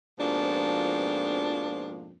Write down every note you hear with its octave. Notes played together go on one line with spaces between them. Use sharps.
F2 G#2 B2 F3 A#3 D4